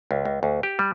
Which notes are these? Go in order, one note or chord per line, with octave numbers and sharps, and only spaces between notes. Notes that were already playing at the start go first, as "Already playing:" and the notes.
C#2
C#2
D2
G4
G3